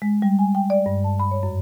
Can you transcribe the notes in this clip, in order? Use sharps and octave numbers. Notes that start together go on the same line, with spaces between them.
G#3
G3
G#5
G5
D5
G2
A5
B5
C#5
F#2